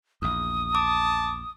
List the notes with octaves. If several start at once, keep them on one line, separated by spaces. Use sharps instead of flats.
A#1 E2 D#6
A5 D6